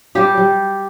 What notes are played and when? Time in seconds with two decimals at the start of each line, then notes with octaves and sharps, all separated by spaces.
0.15 G3 G4
0.37 G3